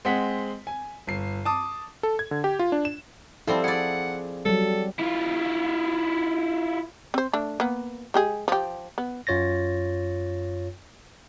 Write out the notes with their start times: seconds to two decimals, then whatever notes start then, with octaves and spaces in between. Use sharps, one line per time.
0.05 G#3 C4 G#4 F#5 B6
0.67 G#5
1.07 G1 C7
1.45 A5 D6 D#6
2.03 A4
2.19 G#6
2.31 D3
2.44 G4
2.59 F4
2.72 D4
2.85 E7
3.47 F3 G3 C4 E4 A4
3.64 G#4 D5 F#5
4.46 F#3 G3 A4
5.00 E4 F4
7.14 C4 C5
7.33 A3 D4
7.60 A#3 B3
8.14 G#3 G4 G#4
8.48 F3 G4
8.98 B3
9.27 F#2 F4 C#5 A6 A#6